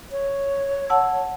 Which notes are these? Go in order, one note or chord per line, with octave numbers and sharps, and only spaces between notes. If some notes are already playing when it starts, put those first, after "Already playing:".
C#5
F#5 A5 E6